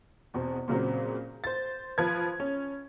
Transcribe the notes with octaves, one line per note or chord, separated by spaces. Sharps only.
E2 B2 C4
A#2 C#3 F#3 C4
C5 A6
F3 B4 G#6
C#4